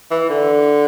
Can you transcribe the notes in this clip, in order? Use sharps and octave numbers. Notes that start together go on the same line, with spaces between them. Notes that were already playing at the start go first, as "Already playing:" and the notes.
E3
D3